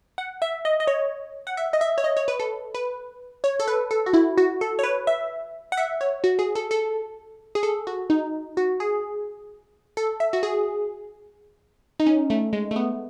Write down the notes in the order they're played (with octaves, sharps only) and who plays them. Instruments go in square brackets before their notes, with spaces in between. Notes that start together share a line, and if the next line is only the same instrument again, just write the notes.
[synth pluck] F#5
E5
D#5
D#5
C#5
F#5
E5
D#5
E5
C#5
D#5
C#5
B4
A4
B4
C#5
A4
B4
A4
F#4
E4
F#4
A4
C#5
B4
E5
F#5
E5
C#5
F#4
G#4
A4
A4
G#4
A4
F#4
D#4
F#4
G#4
A4
E5
F#4
G#4
D#4
C#4
A3
G#3
A3
B3